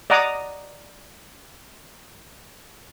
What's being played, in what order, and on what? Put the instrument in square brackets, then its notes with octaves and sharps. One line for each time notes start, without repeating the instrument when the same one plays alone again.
[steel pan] D5 D#5 F#5 A#5 D6 D#6